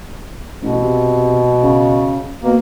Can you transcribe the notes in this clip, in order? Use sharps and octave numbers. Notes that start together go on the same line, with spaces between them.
A1 B2
C3
C#3
B2 A#3